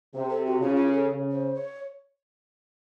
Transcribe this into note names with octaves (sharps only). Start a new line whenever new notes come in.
C3 C5
A4
F#4
C#3 F4
F4
A#4
A4
C#3
C5
C#5